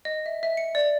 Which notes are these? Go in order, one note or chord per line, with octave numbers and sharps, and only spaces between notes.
D#5
E5
E5
C#7
D5